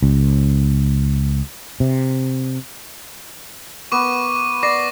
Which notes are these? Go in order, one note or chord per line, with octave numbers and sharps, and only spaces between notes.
C#2
C3
B3 C#6 D6 D#7
D5 D6 A#6 C7